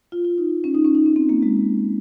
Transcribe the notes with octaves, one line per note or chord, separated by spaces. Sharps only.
F4
F4
D#4
C#4
D#4
C#4
D#4
C#4
C4
A#3
G#3